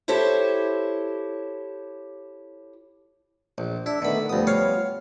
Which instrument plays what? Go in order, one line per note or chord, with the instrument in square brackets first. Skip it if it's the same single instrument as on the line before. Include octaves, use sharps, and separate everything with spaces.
[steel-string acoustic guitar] E4 G4 A4 C5 C#5
[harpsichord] A#1
[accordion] D4 [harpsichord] E4
[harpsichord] D3 B5 [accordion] D#3 A3 B3
[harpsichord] D2 D#6 [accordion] F3 G3 B3
[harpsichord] C#5 F5